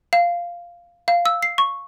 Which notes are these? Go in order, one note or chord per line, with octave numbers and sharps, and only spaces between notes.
F5
F5
E6
C7
C#6